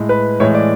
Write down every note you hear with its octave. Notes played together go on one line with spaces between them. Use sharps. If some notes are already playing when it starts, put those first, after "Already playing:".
Already playing: A2 G#3
B4
A2 E3 G#3 C#5
D5